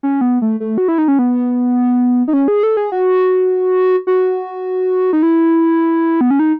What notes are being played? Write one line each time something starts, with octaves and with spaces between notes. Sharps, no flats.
C#4
B3
A3
A3
F#4
E4
D#4
C#4
B3
D#4
C#4
G#4
A4
G#4
F#4
F#4
D#4
E4
B3
C#4
D#4